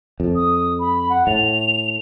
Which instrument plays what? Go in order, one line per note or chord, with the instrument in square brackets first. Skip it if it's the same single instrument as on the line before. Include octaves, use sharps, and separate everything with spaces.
[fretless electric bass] F2
[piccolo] D#6
B5
F#5
[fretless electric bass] A2 [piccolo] F7